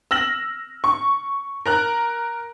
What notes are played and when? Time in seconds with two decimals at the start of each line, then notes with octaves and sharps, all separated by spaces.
0.11 E6 F6 A#6 F#7
0.84 C#6
1.66 A#4 A#5 F#6